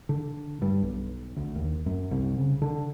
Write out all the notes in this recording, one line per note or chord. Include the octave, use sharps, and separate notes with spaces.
D3
G2
B1
D2
D#2
F#2
C2
C#3
D3